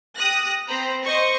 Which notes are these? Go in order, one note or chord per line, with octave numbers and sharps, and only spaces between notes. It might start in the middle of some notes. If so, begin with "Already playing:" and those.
G4 D#6 F#6 A#6
C4 C5 A#5 B5
C5 D#5 C#6